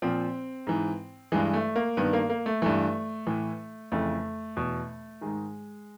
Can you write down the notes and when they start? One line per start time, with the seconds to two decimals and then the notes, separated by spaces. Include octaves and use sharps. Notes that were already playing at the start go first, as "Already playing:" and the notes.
0.02 A#2 F3 C4
0.67 G#2 E3
1.32 G2 E3 G#3
1.54 A3
1.76 A#3
1.97 G2 D#3 B3
2.13 A#3
2.30 A#3
2.46 A3
2.62 G2 E3 A3
3.27 A2 E3
3.92 F2 C#3 E3 A3
4.57 E2 B2
5.21 G#2 D#3 G#3